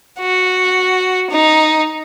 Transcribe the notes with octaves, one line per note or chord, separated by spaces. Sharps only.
F#4
D#4